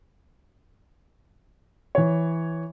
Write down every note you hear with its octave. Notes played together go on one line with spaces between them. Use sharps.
E3 C#5